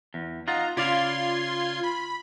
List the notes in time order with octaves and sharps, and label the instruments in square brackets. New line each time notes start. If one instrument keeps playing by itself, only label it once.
[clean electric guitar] E2
[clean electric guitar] D#4 F4 F#5 [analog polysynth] A#5
[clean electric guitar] C#3 D5 F5 [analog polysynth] F4 C6 G#6
[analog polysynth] B5